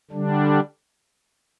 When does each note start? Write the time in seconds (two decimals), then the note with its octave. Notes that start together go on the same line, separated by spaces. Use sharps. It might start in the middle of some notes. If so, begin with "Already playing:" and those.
0.11 D3 G3 D4